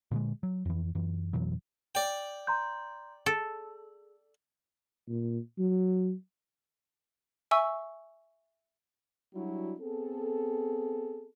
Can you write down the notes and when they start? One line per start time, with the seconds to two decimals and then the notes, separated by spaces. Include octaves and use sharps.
0.11 A#2 D3 F#3 G#3
0.43 F#3
0.65 F2 E3
0.95 F#2 E3
1.33 F2 B2 E3 F#3
1.95 D5 G5
2.47 A#5 C6 G6
3.26 G#4 A4
5.09 A#2
5.58 F#3
7.51 E5 G#5 C#6 E6
9.34 F#3 G3 D4 E4 F#4
9.80 B3 C4 G#4 A4